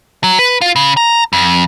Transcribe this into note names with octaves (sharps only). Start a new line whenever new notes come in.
F#3
B4
F4
C#3
A#5
F2